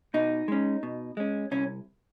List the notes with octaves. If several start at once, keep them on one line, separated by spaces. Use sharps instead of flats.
B2 D#4
G#3 C#4
B2
G#3 C#4
C2 C#4